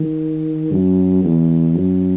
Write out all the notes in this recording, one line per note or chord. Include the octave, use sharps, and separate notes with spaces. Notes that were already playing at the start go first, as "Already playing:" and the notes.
Already playing: D#3
F#2
E2
F#2